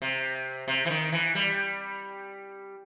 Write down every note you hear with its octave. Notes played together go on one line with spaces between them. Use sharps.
C3
C3
E3
D#3
E3
G3